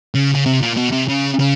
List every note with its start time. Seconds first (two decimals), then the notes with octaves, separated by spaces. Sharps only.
0.15 C#3
0.35 C#3
0.46 C3
0.62 A#2
0.76 B2
0.92 C3
1.08 C#3
1.40 C#3